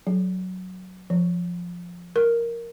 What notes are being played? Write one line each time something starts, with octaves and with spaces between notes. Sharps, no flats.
F#3
F3
A#4